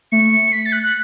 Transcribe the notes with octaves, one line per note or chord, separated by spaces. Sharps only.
A3 C#7
B6
A6
F#6
F#6